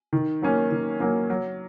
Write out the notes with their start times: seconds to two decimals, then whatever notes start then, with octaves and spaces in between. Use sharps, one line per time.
0.13 D#3
0.42 F#3 A#3 C#4
0.71 D#3
1.00 F#3 A#3 C#4
1.30 F#3